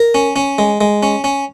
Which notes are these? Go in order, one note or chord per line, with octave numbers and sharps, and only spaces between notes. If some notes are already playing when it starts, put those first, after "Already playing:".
Already playing: A#4
C#4
C#4
G#3
G#3
C#4
C#4